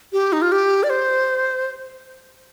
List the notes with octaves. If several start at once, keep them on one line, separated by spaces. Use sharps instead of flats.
G4
D#4
F4
G4
D5
C5